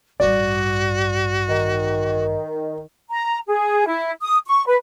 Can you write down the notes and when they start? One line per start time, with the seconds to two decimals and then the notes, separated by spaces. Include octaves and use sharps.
0.20 A1 G2 F#4 D5
1.49 D#3
3.09 A#5
3.47 G#4
3.86 E4
4.21 D#6
4.47 C#6
4.66 B4